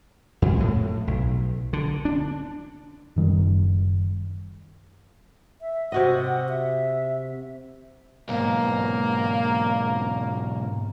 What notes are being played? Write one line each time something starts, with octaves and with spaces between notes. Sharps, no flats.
F2 G#3
F2 A2
B1
D3
D4
F#1 D#3 G3
E5
C3 F#4 D#5 F#5
E5
B1 G#2 A#3